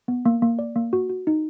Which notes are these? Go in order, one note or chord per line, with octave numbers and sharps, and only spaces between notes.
B3
A#3
A#3
D5
A#3
F#4
F#4
D#4